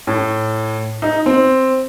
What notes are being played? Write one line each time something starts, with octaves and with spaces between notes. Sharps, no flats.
A2
D#4
C4